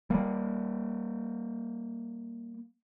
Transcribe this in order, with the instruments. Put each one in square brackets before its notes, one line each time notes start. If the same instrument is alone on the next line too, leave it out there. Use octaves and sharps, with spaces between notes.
[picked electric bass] G3 A#3